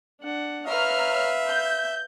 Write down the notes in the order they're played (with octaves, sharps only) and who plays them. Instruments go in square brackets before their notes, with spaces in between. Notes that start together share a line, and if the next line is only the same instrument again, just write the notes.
[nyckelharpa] D4 F#5
[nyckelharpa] B4 F5 [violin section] C#5 A#5 F6 [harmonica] E5
[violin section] G6